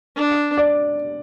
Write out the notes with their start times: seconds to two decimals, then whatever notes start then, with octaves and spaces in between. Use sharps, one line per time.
0.17 D4
0.57 D5